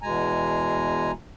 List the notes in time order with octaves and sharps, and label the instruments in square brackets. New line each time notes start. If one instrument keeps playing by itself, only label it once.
[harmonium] E2 B2 G#3 G#5 A#5